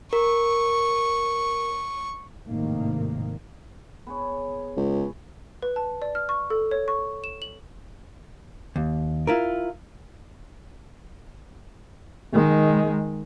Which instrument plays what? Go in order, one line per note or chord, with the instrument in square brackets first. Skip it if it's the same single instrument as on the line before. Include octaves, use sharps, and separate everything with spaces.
[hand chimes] A#4 [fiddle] C#6
[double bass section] G#1 A2 C3 D#3 A#3
[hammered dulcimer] B3 G#4 C#5
[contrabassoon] C#2
[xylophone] B4
A5
D5
F6
C#6
A4
C#5
C#6
E7
F#7
[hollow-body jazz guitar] D#2
E4 F4 A#4
[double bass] D#3 G#3